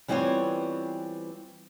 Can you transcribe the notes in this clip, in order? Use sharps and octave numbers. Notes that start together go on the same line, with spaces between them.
E3 G3 B3 C4 F4 C#5